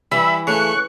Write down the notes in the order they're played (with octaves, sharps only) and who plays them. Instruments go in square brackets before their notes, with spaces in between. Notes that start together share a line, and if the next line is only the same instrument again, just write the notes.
[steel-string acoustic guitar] E3 [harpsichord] G3 [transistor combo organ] E5 B5
[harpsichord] C#3 A3 [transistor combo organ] C#6 [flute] F#6